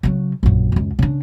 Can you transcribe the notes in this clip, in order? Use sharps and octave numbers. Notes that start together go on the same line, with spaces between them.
C#3 F#3
A#1 F#2
C#2 F#2
C#3 D4